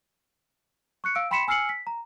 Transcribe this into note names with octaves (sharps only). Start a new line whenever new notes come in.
C#6 F#6 C#7
F5 E6 D7
G5 B5 C6 B6 C#7 E7
G#5 E6 F6 C7 C#7 F#7
B6
A#5